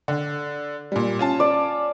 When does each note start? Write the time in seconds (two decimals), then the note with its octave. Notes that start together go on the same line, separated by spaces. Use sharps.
0.08 D3
0.92 A#2 G3
1.19 C#4 F4 A5
1.40 D5